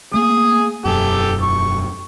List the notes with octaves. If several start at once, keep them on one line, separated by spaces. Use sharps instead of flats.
A3 A#3 G#4 D#6
E1 F#2 G4 A4
C#6